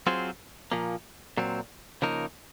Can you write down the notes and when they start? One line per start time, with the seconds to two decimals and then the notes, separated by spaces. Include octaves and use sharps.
0.07 F#3 C4 F4 G#4 C5
0.72 A#2 F3 A#3
1.37 A#2 F#3 C4
2.02 C#3 F3 A#3 D#4 A#4